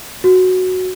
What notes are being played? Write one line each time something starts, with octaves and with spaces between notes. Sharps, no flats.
F#4